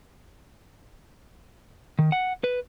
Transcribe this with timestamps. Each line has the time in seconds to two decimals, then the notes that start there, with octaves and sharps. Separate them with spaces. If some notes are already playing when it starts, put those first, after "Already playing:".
1.99 D#3
2.12 F#5
2.44 B4